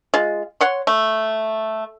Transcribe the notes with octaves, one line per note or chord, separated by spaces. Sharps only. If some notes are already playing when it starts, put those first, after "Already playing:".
G#3 F4
C#5 F#5 C6
A3